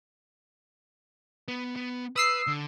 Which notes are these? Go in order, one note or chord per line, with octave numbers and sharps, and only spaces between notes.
B3
B3
B4 D#6 E6 C7
D3